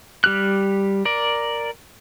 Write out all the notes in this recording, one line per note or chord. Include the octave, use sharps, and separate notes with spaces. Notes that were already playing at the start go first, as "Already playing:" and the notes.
G3 G4 F6 F#6
A#4 D5